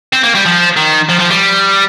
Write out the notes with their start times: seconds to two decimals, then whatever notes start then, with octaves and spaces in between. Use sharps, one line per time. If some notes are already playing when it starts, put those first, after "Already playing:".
0.13 C4
0.24 A#3
0.35 G3
0.45 F3
0.76 D#3
1.09 F3
1.19 F3
1.30 G3